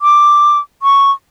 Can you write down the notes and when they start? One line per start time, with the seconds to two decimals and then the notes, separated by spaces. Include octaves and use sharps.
0.02 D6
0.83 C#6